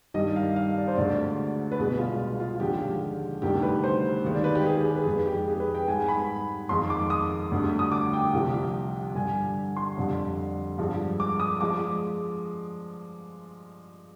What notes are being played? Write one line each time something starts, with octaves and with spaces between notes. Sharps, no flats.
G2 D#3 G3 D#5
F5
F5
D5
C5
D2 D3 G#3 D5
B4
C2 B2 G#3 G#4
F4
F4
F4
D#2 D3 F3 G#3 G4
D2 C3 D#3 G3 G4
B4
C5
D#2 D#3 G#3
D5
B4
G4
G#4
G4
G#4
B4
F2 D#3 G#3
G4
G#4
B4
G5
G#2 G3 G#5
B5
F2 D#3 G#3 C6
D6
D#6
D2 D3 G3
D#6
D6
G5
C2 C3 F3
G2 D3 G3 G#5
C6
F2 D3 G3
G2 F3 G#3
D6
D#6
F3 G#3 D6